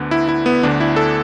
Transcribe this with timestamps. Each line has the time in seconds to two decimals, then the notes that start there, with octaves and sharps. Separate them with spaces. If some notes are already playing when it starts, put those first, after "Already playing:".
Already playing: D2 D3 B3
0.11 E4
0.28 E4
0.46 B3
0.63 D2 D3 D4
0.80 E4
0.96 A4